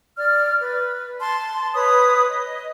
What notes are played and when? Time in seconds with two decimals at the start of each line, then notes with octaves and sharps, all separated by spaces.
0.18 D5 F6
0.59 B4
1.20 A5 C6
1.75 B4 C#5 B5 D#6
2.28 D#5